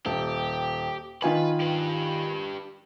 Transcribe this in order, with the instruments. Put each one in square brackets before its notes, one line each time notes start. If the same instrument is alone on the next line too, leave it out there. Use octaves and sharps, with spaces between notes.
[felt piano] D#1 [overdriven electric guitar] G4
[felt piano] D#3 F4 G#5 [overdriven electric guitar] B4
[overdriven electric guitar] G4 B4